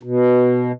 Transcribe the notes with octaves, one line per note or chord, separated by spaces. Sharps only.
B2